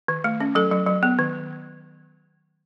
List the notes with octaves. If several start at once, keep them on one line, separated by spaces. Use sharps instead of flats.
D#3
A3
C#4
F#3 A4
F#3
F#3
B3
D#3